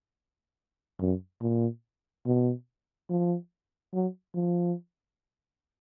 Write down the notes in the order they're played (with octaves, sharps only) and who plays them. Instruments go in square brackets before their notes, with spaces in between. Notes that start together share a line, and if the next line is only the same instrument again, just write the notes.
[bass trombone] F#2
A#2
B2
F3
F#3
F3